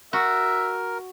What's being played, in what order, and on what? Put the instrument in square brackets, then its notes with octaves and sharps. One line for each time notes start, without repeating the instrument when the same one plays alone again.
[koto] F#4 [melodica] A#4 [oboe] E5